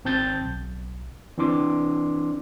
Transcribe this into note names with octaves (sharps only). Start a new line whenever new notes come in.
G#1 C4 A5 G6 A6
B1
E3 C4 D4 C6 D6